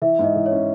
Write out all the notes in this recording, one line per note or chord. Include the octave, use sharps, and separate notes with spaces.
E3 E5
G#2
D#5
E3
C#5
C#4